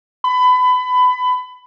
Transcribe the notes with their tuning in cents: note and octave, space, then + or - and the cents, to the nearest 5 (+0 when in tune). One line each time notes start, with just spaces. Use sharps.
B5 +25